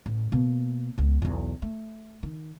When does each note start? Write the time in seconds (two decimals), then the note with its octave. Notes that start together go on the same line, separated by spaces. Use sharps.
0.06 A1
0.32 B2 A#3
0.98 C#2 B3
1.22 B1 E2
1.62 A3
2.23 D#3